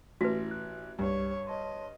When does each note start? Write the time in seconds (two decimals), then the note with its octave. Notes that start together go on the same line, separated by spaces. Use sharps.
0.21 A1 E4 F#4 B4 A#6
0.51 F#6
0.99 C2 G2 G3 G4 C#5
1.47 C#5 D#5 A5 C6